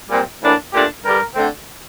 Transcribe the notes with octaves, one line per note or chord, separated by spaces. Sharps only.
A#2 G3 C4
A2 E3 A#3 D4
A#2 A3 D4 G4
G2 D3 G3 A#4
D3 A3 C4